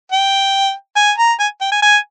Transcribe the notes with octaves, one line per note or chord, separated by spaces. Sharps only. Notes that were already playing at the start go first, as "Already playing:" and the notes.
G5
G#5
A#5
G#5
G5
G#5
G#5